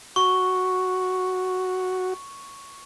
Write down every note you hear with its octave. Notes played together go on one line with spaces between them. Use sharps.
F#4 C#6